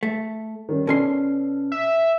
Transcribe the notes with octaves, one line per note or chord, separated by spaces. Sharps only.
A3
D#3 G3 C#4
B2 C#4 A4 D5 C6
E5